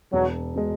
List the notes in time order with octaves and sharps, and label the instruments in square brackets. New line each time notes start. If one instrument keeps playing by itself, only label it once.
[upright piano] E1 [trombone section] F#3
[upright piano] B2 G#3